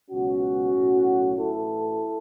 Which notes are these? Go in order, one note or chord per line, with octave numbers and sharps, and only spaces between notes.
C#2 B2 F#3 C#4 F#4
B1 A2 F#3
A1 A2 E3 E4 A4